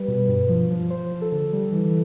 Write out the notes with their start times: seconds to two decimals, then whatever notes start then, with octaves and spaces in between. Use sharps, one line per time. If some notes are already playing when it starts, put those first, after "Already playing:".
Already playing: G3 B4
0.08 B2
0.28 G2
0.49 F3
0.71 F3
0.90 F3 C5
1.12 F3
1.22 A4
1.32 D3
1.53 G3
1.72 E3